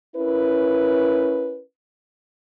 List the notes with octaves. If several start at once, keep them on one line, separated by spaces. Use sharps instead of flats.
C#4 E4 A#4 B4